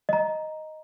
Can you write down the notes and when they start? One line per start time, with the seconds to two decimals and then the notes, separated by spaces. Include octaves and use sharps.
0.09 D#5 A#5